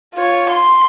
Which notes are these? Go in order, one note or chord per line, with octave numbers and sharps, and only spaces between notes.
F4 C#5
C6